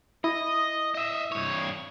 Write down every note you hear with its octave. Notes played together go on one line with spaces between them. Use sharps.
E4 D#5
D#5 E5
G2 C#5